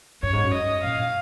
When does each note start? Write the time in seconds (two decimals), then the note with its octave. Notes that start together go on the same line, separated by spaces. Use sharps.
0.23 F#2 C#5
0.33 G#2
0.43 F#2
0.53 D#5
0.84 A#2 F5